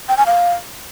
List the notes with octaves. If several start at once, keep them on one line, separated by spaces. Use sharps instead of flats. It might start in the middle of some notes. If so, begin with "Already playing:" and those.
G5
G#5
F5